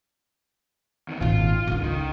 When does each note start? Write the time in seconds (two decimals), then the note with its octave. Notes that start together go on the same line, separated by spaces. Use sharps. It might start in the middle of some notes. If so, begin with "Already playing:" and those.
1.08 E2 D#3
1.21 G#1 A#2 F4
1.67 C#2 D3
1.83 D#3